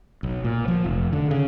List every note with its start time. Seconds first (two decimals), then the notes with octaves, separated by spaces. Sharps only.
0.23 B1
0.44 A#2
0.68 F3
0.84 F1
1.13 D3
1.31 C#3